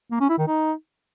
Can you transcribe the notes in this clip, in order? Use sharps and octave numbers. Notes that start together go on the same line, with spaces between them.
A#3
C#4
E4
D#3
D#4